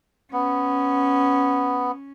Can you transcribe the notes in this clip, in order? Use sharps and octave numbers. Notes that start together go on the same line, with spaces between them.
B3 C#4